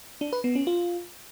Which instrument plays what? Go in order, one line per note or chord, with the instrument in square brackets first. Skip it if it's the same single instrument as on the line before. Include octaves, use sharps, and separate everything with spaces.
[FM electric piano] D4
B4
B3
C#4
F4